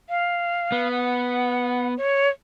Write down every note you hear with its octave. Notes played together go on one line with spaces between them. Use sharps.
F5
B3
F#5
C#5